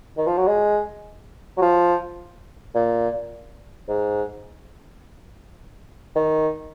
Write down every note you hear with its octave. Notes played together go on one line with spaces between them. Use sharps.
D#3
F3
F#3
G#3
F#3
F3
A#2
G#2
D#3